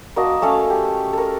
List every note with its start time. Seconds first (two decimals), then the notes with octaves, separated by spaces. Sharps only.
0.16 A#3 F#4 D#5 A5
0.42 A3 C#4 A4 F5
0.70 G4
1.13 A4 A#4